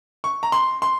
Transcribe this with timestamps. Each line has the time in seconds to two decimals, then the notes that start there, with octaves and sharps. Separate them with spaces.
0.24 C#6
0.43 A#5
0.52 C6
0.82 C6